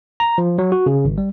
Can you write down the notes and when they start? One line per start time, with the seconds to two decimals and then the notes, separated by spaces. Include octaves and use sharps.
0.20 A#5
0.38 F3
0.58 F#3
0.72 F#4
0.86 C#3
1.05 G#1
1.18 G3